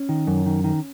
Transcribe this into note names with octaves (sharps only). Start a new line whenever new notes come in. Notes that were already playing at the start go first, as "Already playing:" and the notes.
Already playing: C#4
D#3
F#2
D#3
D#3